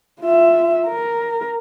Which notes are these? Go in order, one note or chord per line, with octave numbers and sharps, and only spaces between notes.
F4 E5
A#4